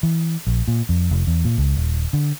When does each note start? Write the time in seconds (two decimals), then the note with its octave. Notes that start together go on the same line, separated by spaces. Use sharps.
0.03 E3
0.47 A#1
0.68 A#2
0.89 F2
1.11 F1
1.27 E2
1.45 A#2
1.58 C#2
1.76 D#1
2.13 D3